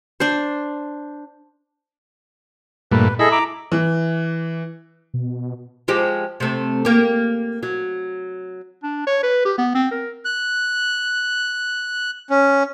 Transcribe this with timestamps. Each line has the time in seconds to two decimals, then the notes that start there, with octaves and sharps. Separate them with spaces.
0.20 D4 C5
2.92 G2 A#2 A3 B4
3.19 E4 G#4 A4 D#5 B5
3.32 A#5 D6
3.72 E3
5.14 B2
5.88 F3 G#3 G4
6.40 C3 A3
6.85 A#3 G4
7.63 F#3
8.84 D4
9.07 C#5
9.23 B4
9.45 G4
9.58 B3
9.75 C4
9.91 A#4
10.25 F#6
12.30 C#4